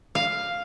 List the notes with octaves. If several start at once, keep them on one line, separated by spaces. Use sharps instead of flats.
F5